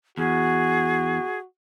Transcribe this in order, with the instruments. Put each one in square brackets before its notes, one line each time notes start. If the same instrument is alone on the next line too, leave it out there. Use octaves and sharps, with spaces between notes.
[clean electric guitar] E2 [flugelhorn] F#4 [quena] G#4